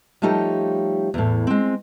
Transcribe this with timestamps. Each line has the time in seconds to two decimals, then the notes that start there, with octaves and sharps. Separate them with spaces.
0.22 F3 G3 A3 D#4 G4 C#5
1.14 E2 A2
1.47 G#3 C4